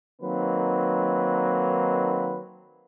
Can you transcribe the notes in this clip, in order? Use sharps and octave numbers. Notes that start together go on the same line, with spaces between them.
D#3 F#3 A#3 C4 D#4 B4